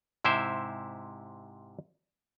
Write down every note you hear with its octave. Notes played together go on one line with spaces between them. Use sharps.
G#2 C3 E4 G4 C5 E5